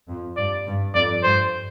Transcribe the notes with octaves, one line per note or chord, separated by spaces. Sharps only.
F2
G2 D5
G2
F2 D5
G2 C5